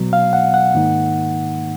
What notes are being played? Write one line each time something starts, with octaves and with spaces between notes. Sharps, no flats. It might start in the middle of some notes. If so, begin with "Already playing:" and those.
Already playing: B2 F#3 B3
F5
F#5
F#5
G#2 D#3 A#3 D#4